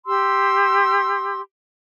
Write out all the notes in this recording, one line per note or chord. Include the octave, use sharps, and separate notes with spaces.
G4 C6 E6